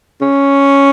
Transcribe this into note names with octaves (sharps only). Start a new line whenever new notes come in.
C#4